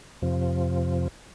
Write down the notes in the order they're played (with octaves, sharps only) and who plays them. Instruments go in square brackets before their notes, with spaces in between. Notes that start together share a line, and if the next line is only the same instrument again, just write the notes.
[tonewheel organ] F2 C3 F3